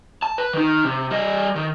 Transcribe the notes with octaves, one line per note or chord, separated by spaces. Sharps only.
A5
B4
D#3 D#4
C3
G3 D#5
D#3